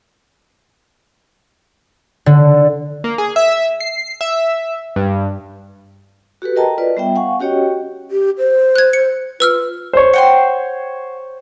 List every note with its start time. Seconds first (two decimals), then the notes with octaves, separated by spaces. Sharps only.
2.26 D3
3.04 A#3
3.18 G#4
3.36 E5
3.80 C7
4.21 E5
4.96 G2
6.42 F#4 G4 A4 B4
6.56 A4 A#4 D#5 G5 A5 A#5
6.78 F4 B4 D5 D#5
6.97 G3 B3 E5 G5
7.16 F5 F#5 G#5 C#6
7.40 C#4 F#4 G4 C#5 D#5 G5
8.11 G4
8.38 C5
8.76 F#6 G#6
8.93 C#7
9.40 F4 B4 E6 F6
9.93 C5 C#5
10.13 F#5 G5 C6